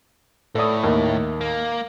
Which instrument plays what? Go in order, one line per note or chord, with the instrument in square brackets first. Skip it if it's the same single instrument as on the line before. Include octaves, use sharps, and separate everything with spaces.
[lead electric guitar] A2 [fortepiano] A4 D5 D#6
[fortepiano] D#2 D#3
[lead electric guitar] A#3